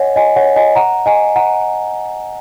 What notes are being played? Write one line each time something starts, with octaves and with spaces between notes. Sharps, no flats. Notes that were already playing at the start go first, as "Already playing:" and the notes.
Already playing: C#5 D#5 F#5 G#5
D#5 G#5
C#5 F#5
D#5 G#5
F#5 A#5
D#5 G#5
F#5 A#5